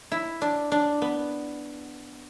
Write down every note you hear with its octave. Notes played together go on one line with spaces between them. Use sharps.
E4
D4
D4
B3